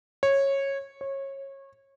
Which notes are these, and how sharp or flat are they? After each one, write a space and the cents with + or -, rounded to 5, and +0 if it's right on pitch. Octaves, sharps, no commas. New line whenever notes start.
C#5 -15
C#5 -25